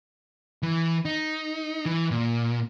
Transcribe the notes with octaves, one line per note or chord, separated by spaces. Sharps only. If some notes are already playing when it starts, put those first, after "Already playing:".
E3
D#4
E3
A#2